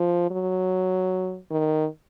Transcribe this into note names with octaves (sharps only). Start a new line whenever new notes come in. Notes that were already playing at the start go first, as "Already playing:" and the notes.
Already playing: F3
F#3
D#3